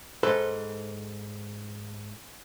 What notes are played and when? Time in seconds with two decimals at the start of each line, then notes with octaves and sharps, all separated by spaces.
0.23 G#2 A4 B4 C5